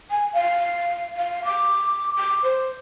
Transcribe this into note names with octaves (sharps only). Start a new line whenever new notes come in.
G#5
F5
F5
D6
D6
C5